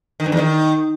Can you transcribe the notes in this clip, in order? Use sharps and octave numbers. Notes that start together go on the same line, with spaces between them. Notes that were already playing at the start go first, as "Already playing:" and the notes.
D#3
G2
E2
D#3